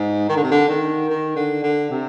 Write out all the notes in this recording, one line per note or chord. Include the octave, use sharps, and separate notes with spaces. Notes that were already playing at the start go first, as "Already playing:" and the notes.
Already playing: G#2
D#3
D3
C3
D3
D#3
D#3
D3
D3
C3